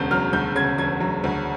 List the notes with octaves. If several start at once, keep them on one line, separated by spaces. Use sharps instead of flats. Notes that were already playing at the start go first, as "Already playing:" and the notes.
Already playing: E1 D2 C#3 G6
F#3 F6
D2 G6
C#3 G#6
E1 G#6
F#3
D2